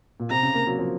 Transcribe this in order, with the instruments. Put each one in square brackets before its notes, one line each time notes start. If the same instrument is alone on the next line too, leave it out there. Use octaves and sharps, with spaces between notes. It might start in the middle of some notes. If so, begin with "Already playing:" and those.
[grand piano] A#2
[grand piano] C3 [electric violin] A#5
[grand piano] C#3
A#3
F#3
F3